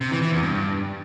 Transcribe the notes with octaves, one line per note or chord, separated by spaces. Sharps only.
C3
E3
E3
E2
G2